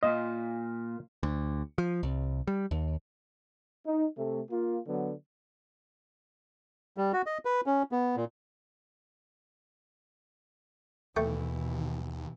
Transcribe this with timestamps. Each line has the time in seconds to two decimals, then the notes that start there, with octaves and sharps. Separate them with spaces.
0.03 A#2 F4 D#5
1.23 D2
1.78 F3
2.03 C2
2.47 G3
2.71 D#2
3.85 D#4
4.16 C3 A3
4.49 A#3 F4
4.86 D3 F#3 B3
6.97 G3
7.13 F#4
7.26 D#5
7.45 B4
7.66 C#4
7.92 B3
8.16 A#2
11.16 D#2 B2 E3 A3 G5